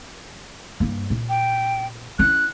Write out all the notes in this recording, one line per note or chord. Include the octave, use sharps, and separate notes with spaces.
G2 A#3
A#2
G5
C#4 E4 F#6